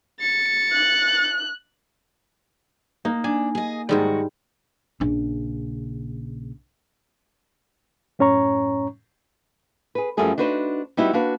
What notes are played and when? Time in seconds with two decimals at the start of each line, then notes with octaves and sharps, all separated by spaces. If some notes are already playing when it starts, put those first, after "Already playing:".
0.20 A6 C#7
0.72 F#6
3.05 A#3 D#4
3.24 D4 G#5
3.55 G#4 D#5
3.89 G#2 D#3 G3 G#3 F#4
5.00 A#1 C#3
8.19 F#2 A2 C#4 C#5 A#5 C#6
9.95 G#4 B4
10.17 F#2 F3 G3 A3 G#4 A#4
10.38 D4 D#4 F#4 B4 C5
10.97 G3 B3 D#4 E4 F#4 G4
11.13 A#3 D4 F#4 B4